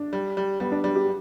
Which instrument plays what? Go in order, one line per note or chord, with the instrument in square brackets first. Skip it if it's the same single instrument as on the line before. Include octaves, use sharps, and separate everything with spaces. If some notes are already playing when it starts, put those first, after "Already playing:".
Already playing: [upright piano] D4
[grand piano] G3
G3
[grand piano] G3 [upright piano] B3
[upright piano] D4
[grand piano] G3 [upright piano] D4
[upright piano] G4